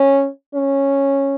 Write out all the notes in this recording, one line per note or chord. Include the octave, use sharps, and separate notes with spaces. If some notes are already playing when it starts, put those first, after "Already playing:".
Already playing: C#4
C#4